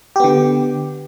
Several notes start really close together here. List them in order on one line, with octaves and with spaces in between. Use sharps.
G4 B3 D3